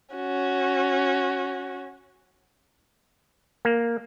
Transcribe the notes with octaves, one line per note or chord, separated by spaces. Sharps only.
C#4 F#4
A#3